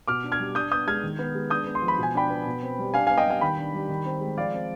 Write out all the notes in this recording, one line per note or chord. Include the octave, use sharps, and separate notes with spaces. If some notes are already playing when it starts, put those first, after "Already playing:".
B2 D6 F6
D4
F6 G#6
G3
D4 D#6 G6
B3 D#6 G6
G#3 F6 G#6
D#3
B3
G#3
D4 D#6 G6
B3
C6
F3
B5
B2 G#5
D4 G5 B5
B3
B2
C4
G3
D4 F5 G#5
B3 F5 G#5
D#5 G5
G3 F5 G#5
D#3 G5 B5
D4
G3
D#3
C4
G#3
F3 D5 F5
C4